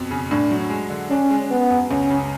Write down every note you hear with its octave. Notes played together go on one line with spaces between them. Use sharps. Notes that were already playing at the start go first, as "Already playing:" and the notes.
Already playing: F2 B2
C#3
A2 D4
F#3
G#3
D3
C#4 D4
G#3
G#3 B3
F#2
C#2 C#4
C#3